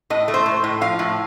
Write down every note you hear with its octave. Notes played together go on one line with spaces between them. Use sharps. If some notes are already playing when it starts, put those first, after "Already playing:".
A2 D#5
A3
C5
A2
A2
F3 F5
A2